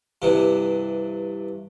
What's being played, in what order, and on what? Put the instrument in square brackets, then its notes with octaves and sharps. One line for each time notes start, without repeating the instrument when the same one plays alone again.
[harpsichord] G2 C3 E3